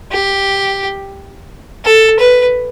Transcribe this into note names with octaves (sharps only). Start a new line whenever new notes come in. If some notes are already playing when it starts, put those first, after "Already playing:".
G4
A4
B4